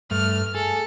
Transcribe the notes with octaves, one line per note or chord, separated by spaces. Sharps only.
G2 A3 F6
G#4 A4